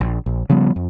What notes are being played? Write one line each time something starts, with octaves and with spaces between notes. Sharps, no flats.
A#1
A#1
C#3 F3 G3 B3
F2